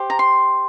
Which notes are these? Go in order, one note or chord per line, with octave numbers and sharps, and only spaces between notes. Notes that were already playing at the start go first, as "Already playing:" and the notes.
Already playing: G4 C5
A#5
C6